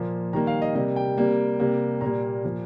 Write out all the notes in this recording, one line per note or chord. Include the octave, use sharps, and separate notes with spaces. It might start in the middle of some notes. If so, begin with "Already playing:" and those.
Already playing: A#2 F3 A#3
D#3 G3 A#3 A#5
F5
D#5
C3 G3 A#3 D#5
G5
C3 G3 A#3
C3 G3 A#3
A#2 G3 A#3 A#5
A#2 F3 A#3